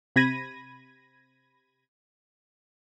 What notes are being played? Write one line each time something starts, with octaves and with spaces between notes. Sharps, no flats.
C3 B5 G#6 A#6 D#7